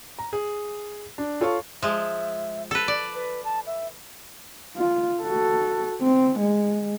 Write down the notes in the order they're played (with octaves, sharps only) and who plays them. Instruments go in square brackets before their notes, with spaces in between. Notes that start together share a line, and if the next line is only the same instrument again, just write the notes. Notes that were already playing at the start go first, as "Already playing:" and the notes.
[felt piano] A#5
G#4
D4
F4 A4 C#5 F5 C#6
[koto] F3 G#3 [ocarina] E5
[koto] A4 B4
D5
[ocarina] B4
A5
E5
[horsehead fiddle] F4
F#4 A4
C4
G#3